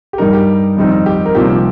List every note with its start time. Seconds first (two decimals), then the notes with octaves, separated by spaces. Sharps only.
0.13 G4
0.18 G2 G3 D#4 A#4
0.33 G4
0.77 F2 D#3 G3 C4 D#4
1.06 G4
1.26 A#4
1.35 C2 A#2 F3 C4 D#4 G4